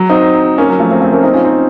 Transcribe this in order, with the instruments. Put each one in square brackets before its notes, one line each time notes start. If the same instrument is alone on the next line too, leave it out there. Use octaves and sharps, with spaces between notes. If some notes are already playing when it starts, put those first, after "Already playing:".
Already playing: [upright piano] F#3
C4 D#4
A#3 C#4
F#3
F3 A3
A3 C4
A3 C4
A#3 C#4
C4 D#4
C#4 F4
C4 D#4